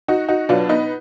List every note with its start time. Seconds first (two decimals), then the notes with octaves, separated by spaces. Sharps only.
0.08 D#4 F#4
0.28 D#4 F#4
0.49 B2 F#3 D4 F4
0.69 B3 D#4